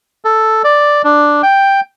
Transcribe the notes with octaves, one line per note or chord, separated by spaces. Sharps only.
A4
D5
D4
G5